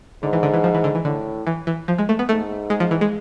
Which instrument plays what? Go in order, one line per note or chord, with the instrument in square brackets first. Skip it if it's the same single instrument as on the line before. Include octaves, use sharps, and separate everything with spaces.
[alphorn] G#2 [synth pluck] D3
[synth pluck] E3
D3
E3
F3
E3
D3
E3
[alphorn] A2 [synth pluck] D3
[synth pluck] E3
E3
F3
G#3
A3
B3
[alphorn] G#2 [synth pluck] A3
[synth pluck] G#3
F3
E3
G#3